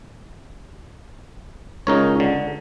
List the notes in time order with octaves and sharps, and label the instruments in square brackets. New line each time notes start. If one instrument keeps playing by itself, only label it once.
[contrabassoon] C#2 [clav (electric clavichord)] D#4 A#4 C#5
[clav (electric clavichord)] D3